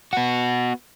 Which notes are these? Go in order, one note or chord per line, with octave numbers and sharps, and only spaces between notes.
B3 F#4